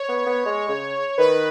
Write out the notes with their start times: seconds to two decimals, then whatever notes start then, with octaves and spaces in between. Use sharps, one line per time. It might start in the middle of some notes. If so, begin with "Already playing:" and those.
Already playing: C#5
0.09 B3
0.26 B3
0.46 G#3
0.69 C#3
1.18 D#3 B4